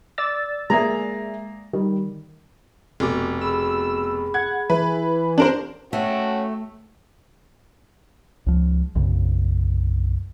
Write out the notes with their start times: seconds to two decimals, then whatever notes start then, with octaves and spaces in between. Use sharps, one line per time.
0.18 D5 E6 A6
0.70 G#3 A#3 G#4 E5 A#5
1.73 D#3 G3
3.00 F1 B2 D6
3.41 G#4 B5 E6
4.34 F#5 G#6
4.70 E3 B4
5.38 C4 D4 G4 A#4 C5
5.93 A3 C#4 F#4 G5
8.46 C#2 F3
8.95 B1 F#2 C#3